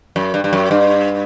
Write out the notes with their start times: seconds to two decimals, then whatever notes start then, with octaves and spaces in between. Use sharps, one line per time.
0.16 F#2
0.34 G2
0.44 G2
0.53 F#2
0.71 G2